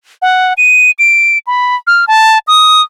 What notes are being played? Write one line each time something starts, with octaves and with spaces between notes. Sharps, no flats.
F#5
D#7
D7
B5
F6
A5
D#6